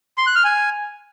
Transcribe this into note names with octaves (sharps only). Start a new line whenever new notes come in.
C6
F#6
F6
G#5